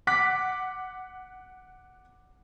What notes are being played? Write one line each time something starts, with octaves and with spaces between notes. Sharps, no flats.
F#5 D6 F#6 B6